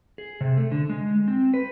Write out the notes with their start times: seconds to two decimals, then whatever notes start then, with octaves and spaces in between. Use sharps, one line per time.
0.18 G#4
0.41 C3
0.57 A3
0.72 D3
0.89 G#3
1.28 C4
1.54 B4